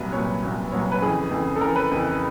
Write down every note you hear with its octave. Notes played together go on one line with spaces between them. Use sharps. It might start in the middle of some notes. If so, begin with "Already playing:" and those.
Already playing: C2 A#2 F#3 B4
C2 A#2 F#3 C#5
C2 A#2 F#3
C2 A#2 F#3 C#5
B4
F2 C#3 E3 G#4
F2 C#3 E3
A4
F2 C#3 E3 A#4
B4
F2 C#3 E3